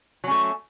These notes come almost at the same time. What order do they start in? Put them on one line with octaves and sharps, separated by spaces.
F#3 C#4 A3